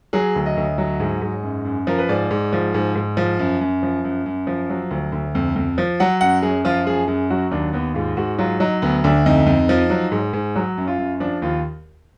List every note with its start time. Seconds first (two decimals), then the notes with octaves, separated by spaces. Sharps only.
0.13 F#3 G#4
0.36 D2
0.46 D#5
0.57 D2
0.78 F#3
1.00 G#2
1.22 G#2
1.43 F#2
1.65 F#2
1.87 F3 A#4
1.98 B4
2.09 G#2 D5
2.31 G#2
2.53 F3
2.74 G#2
2.95 G#2
3.17 F3
3.39 F#2
3.61 F#2
3.83 F3
4.05 F#2
4.26 F#2
4.47 F3
4.70 F#3
4.91 D2
5.12 D2
5.35 F2
5.56 F2
5.78 F3
6.00 F#3 F#5
6.21 F#2 F#5
6.42 F#2 G#4
6.65 F3 F4
6.87 F#2 G#4
7.08 F#2 G#4
7.30 F#3 F#4
7.51 D#2 D4
7.73 D#2 B3
7.94 G#2 F4
8.17 G#2 F#4
8.38 F#3 F4
8.60 F#3 D#4
8.82 D2 B3
9.04 D2 D4
9.26 F2 D#4
9.46 F2
9.69 F3
9.90 F#3
10.12 G#2
10.33 G#2
10.56 F#3
10.77 F#2
10.87 F4
10.98 F#2
11.20 F3 D4
11.42 D#2 F4